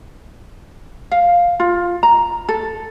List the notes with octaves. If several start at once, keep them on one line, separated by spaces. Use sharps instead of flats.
F5
F4
A#5
A4